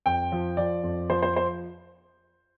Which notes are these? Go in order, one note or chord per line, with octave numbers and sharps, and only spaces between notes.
F2 G5
F3
F3 D5
F2
F3 C5
C5
C5